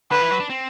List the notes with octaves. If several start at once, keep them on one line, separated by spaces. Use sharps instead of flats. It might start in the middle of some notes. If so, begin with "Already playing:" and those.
D3 B4
E3
F#3
D4
C4